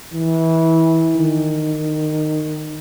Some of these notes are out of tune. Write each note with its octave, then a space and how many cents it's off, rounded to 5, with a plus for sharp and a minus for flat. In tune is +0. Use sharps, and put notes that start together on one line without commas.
E3 -20
D#3 -20